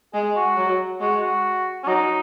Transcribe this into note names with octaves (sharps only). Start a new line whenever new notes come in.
G#3 G#4
F#4
F#3
G#3 F#4
F#4
C#4
F#3 D#4